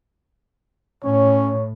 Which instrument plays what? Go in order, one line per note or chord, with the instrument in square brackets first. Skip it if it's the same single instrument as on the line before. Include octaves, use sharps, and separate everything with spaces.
[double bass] A2 [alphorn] C#4 [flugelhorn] C#5